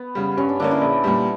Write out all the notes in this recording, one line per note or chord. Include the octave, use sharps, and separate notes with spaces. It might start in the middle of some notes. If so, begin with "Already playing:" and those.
Already playing: B3
C#3 G3
G2 C#4
D4
D3 A#3 C#4 D4
E4
A#1
A#2 G3